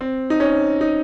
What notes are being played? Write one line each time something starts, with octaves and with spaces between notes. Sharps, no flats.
C4
D#4
C#4
D#4